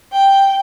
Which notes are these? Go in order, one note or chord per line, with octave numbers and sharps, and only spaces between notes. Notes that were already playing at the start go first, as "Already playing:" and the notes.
G5